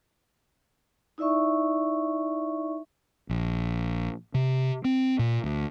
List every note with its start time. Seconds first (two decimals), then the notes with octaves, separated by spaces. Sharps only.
1.18 D#4 E4 D5 E5 C#6
3.29 A#1
4.34 C3
4.84 C4
5.19 A#2
5.44 D2